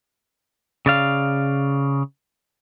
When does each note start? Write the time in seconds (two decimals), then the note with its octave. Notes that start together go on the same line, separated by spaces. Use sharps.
0.86 C#3 D5 F5